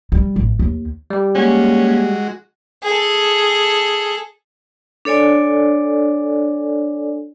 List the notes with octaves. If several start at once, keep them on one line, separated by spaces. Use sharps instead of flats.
G3
A1
D#2
G3 G4
G#3 A#3 C#4 F#4
G#4 A4
D4 A4 C#5 D5 G#5